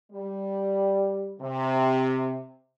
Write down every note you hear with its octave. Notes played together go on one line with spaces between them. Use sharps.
G3
C3